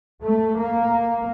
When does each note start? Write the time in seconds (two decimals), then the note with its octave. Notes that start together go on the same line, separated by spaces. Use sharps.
0.22 A3
0.56 A#3